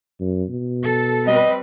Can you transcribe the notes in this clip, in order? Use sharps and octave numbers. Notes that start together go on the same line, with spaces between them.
F#2
B2
A4
G3 C4 B4 D#5